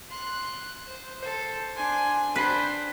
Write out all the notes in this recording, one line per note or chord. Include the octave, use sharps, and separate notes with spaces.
C6 F#6
C5
A4 C5
D4 G#5 C6
D4 B4 C5 G5 F#6 B6 C7